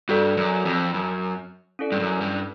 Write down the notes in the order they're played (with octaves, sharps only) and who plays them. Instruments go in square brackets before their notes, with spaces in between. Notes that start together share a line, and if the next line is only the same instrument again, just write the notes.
[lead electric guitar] G2 [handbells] F#4 A4 D5
[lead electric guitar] F#2
F2
F#2
[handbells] C#4 E4 A4 D5
[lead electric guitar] G2
F#2
G2